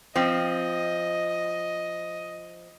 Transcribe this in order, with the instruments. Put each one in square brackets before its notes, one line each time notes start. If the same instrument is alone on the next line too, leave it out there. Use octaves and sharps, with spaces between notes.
[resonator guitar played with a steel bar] F3 C4 [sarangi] D#5